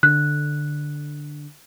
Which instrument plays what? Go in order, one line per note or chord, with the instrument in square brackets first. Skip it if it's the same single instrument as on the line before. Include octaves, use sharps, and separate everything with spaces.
[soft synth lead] D3 [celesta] F#6